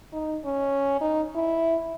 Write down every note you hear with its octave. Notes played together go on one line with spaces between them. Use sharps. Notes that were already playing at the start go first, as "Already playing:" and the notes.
D#4
C#4
D#4
E4